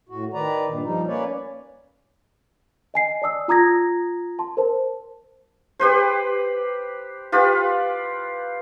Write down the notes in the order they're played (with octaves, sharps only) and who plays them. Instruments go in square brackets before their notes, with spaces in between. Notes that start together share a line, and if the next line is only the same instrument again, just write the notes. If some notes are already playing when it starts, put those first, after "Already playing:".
[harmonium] A2 F#4
D#3 B4 D5 A#5
G2 A#2
F3 G3 D#4
A#3 C#4 B4 C#5 D5
[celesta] D#5 G#5 C7
D5 A5 D#6 E6
F4 A#5 D#6 G#6 A#6
A5 C6
A#4 C5 A5
[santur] G4 B4 C5
F4 G4 B4